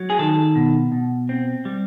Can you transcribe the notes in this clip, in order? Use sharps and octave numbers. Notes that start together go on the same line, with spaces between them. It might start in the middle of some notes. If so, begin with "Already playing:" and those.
Already playing: F#3
G#4
D#3 A4
B2
B2
C4
G3